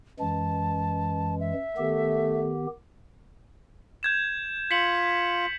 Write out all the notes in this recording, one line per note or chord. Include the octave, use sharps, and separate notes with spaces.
F#2 E3 G#3 A5
E5
D#3 A3 B3 G4
G6 G#6 E7
F4 B6 C#7 F#7